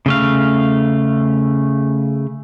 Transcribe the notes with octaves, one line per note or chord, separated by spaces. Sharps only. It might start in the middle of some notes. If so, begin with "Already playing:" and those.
C#3 A3 F5